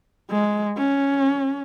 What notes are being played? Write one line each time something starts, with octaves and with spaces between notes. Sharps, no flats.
G#3
C#4